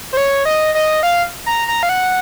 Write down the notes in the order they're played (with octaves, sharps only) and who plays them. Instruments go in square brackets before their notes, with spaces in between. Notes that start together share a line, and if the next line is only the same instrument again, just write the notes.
[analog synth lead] C5
C#5
D#5
D#5
F5
A#5
A#5
F5
F#5